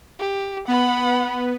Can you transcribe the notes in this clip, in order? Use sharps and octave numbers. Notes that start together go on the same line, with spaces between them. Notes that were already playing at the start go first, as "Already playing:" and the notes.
G4
B3 F#5 B5